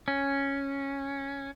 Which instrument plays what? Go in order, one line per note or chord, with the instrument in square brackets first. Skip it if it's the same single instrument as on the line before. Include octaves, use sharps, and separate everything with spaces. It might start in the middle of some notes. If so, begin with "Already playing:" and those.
[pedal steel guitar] C#4